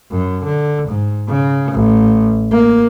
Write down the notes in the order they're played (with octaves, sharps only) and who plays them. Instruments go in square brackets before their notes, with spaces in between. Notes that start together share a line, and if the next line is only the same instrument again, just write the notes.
[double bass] F#2
D3
G#2
C#3
A1
A#3